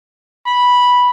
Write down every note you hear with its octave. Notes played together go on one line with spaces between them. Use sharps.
B5